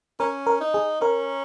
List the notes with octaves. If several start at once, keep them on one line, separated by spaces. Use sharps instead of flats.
C#4 A#4
A#4
D#4
G#4
C#4 A#4